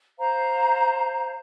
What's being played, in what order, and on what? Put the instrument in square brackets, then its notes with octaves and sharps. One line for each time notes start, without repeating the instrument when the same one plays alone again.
[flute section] C5 F5 A#5